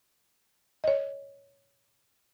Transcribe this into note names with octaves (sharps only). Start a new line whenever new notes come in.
C#5 D#5